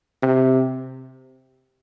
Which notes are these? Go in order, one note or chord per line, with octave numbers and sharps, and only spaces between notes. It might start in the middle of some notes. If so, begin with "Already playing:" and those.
C3